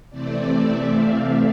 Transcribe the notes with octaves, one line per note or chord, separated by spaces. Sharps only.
C3 E3 A3 C4 D5
E5
F5